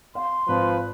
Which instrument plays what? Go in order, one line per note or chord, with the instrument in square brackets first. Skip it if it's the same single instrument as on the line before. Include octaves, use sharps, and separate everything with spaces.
[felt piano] F5 [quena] C6
[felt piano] G#1 [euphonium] F3 [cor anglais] B4